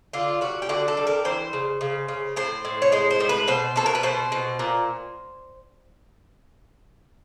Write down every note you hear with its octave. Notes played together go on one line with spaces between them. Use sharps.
D3 F4
G3 F#4
G4
D3 F#4
A4
G3
A#4
E3 C5
C#3
C#3
C#3
A2 C5
A2
C#5
G#3 C5
C5
A2
B4
B2 C5
B2 A4
A#4
B4
B2 C5
B2
A#2